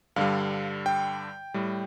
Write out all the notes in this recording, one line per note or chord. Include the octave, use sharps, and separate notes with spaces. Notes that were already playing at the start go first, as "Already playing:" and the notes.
G2 D3 G3 F5
G5
A2 G3